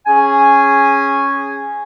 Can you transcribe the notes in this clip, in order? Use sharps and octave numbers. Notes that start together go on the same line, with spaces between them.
C#4 G#4 G#5